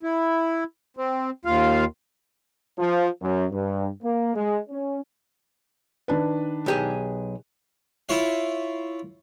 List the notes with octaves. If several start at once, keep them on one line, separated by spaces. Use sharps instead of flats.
E4
C4
D#2 F4 F5
F3
F#2
G2
A#3
G#3
C#4
D#3 D4 B4
B1 G4 G#4
E4 F4 C#5 F5